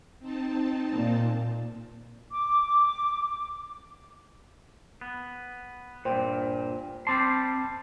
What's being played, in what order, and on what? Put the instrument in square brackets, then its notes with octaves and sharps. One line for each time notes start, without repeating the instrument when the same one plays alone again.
[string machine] C4 D#4 A5
[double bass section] A#2
[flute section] D6
[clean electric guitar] B3
[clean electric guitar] G2 A#2 [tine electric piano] C5 G5
[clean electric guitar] G3 C4 C6 [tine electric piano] A5 D6 A6